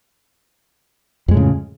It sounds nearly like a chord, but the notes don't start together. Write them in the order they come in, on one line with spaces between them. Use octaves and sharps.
F2 G#3 A2 C#3